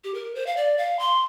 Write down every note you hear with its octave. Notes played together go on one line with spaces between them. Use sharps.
G4
A#4
C5
F5
D5
F5
C6